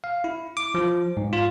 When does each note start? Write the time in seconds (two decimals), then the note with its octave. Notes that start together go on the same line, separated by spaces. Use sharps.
0.04 F5
0.24 E4
0.57 D6
0.75 F3
1.17 G#2
1.33 F4